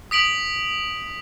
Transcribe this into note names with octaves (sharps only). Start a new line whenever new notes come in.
D#6 B6 D7 F#7